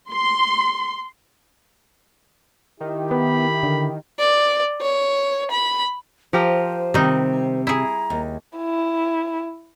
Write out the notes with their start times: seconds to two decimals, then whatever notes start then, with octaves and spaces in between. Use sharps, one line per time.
0.10 C6
2.81 D#3 E4 G4
3.11 B3 B5
3.63 D3
4.19 D5
4.81 C#5
5.51 B5
6.33 F3 G4 A#4 C5
6.94 C3 D#3 G3 D#4
7.67 E4 G#4 A#5
8.10 D#2
8.57 E4